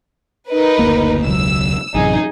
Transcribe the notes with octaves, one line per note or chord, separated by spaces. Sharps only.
D#4 A#4 B4
F#1 D2 A#3
E1 C#2 F#3 E6
A1 F#2 C3 D#4 G#4